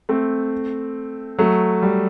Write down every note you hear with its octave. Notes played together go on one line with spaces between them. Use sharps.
A3 C4
F#3 A3
G3